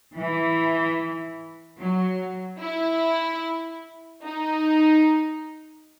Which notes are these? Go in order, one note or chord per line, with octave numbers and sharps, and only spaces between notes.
E3
F#3
E4
D#4